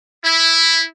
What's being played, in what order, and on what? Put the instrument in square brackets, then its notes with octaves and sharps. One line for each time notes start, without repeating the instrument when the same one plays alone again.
[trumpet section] E4